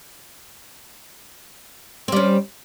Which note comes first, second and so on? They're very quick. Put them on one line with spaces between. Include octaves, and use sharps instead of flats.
C4 G3 C#4